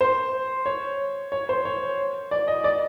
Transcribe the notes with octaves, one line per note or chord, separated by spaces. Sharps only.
C5
C#5
C#5
C5
C#5
D5
D#5
D5